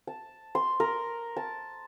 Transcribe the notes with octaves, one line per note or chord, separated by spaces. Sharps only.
A5
C6
A#4
A5